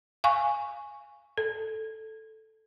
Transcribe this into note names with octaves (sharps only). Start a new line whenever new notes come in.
F5 G#5 C#6
A4